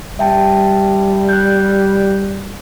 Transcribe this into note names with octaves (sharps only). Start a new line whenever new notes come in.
G3 E5 G5 A5
F#6 G6